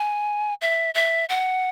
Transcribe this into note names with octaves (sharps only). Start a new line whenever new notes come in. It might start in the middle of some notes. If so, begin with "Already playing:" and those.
Already playing: G#5
E5
E5
F#5